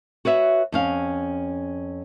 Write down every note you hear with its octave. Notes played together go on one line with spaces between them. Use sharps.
F#4 B4 C#5 E5
F2 C#4 F5